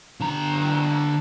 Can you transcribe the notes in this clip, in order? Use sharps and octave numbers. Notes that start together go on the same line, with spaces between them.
D3 A#5